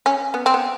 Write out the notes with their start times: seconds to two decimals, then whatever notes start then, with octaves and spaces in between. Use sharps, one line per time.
0.06 C#4
0.34 B3
0.46 C4
0.54 B3